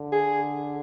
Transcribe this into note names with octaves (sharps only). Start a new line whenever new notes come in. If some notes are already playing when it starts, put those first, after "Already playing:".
Already playing: D3
G#4